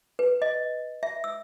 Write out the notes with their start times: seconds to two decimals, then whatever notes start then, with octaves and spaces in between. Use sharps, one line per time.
0.19 B4
0.42 D#5
1.03 E5
1.24 E6